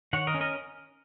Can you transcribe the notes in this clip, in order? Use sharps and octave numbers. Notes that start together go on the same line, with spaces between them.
D#3 C#5 F#5
A#4 D#5
C#4
A#4 D#5